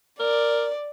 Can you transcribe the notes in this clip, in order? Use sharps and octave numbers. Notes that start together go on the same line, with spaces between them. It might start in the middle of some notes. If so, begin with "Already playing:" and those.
A#4 D5